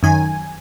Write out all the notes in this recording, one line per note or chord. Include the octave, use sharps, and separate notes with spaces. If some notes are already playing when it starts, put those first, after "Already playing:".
F#2 D#3 G#5